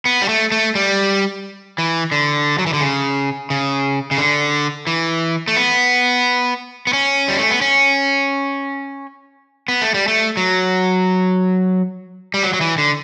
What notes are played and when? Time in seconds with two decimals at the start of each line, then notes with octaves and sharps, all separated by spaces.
0.05 B3
0.22 G3
0.29 A3
0.52 A3
0.75 G3
1.78 E3
2.12 D3
2.59 F#3
2.66 E3
2.73 D3
2.81 C#3
3.50 C#3
4.11 C#3
4.18 D3
4.87 E3
5.48 A3
5.56 B3
6.87 B3
6.93 C#4
7.28 G3
7.39 A3
7.51 B3
7.61 C#4
9.68 B3
9.82 A3
9.94 G3
10.08 A3
10.37 F#3
12.34 G3
12.43 F#3
12.53 F#3
12.61 E3
12.78 D3